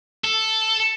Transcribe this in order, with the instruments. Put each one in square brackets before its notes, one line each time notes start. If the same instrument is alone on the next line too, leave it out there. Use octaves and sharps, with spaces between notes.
[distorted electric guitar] A4